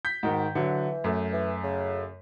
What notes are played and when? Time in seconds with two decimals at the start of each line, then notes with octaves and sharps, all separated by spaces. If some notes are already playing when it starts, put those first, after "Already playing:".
0.05 G6 B6
0.23 G#2 D#3 F#4
0.55 D3 E3 F#3
1.04 F#2 A3
1.33 E3
1.63 C#3